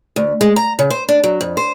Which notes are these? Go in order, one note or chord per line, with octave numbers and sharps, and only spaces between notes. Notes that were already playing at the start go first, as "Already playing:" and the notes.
D2
G#3
A#5
C#3
C5
D4
F#3
F2
C5